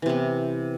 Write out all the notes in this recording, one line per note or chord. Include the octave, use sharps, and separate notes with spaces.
C3 E3 B3